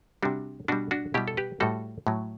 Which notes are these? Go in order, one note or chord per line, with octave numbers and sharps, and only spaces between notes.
C3 G3 D4 F#4
B2 G3 D4 F#4
D4 F#4
B2 G3 E4 G4
A4
G4 B4
A2 G3 F#4 A4
A2 F#3